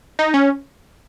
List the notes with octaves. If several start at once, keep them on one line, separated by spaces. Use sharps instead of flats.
D#4
C#4